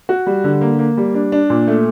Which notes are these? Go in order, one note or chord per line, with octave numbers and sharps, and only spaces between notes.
F#4
G3
D3
A#3
A#3
G3
D4
D4
A#2
A3